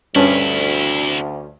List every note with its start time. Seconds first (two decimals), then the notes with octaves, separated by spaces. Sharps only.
0.16 D2 G2 C3 C#4 E4